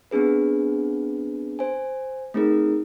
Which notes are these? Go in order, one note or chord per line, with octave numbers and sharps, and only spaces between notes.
B3 C4 D4 G#4 B4
C5 G#5
A3 C4 D#4 G#4 A#4